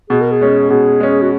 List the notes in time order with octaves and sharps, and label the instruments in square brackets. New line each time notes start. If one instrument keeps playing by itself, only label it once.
[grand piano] B2 [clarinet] G#4
[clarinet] A#4
G#4
[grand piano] G#3 C#4
[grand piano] B2 [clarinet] G#4
[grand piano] G#3 C#4
[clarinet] F#4